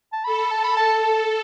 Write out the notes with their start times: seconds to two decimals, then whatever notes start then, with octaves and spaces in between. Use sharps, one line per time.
0.13 A5
0.24 A4 B5
0.38 B5
0.51 A5
0.64 B5
0.77 A5
1.03 A5